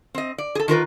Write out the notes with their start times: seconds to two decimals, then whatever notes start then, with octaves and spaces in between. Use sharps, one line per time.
0.15 C4 D#5
0.38 D5
0.55 G#4 A4
0.68 D#3 F4 A#4 B4